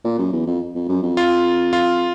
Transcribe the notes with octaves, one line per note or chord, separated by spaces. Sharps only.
A#2
F#2
E2
F2
F2
F#2
F2
F4
F4